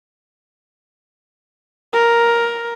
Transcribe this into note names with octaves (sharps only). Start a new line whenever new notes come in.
A#4